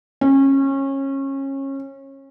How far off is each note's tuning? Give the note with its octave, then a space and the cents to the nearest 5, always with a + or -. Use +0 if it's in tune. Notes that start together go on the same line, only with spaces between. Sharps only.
C#4 -25